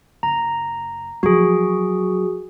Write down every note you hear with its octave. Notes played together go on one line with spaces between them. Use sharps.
F#1 A#5
F3 F#3 F#4 G#4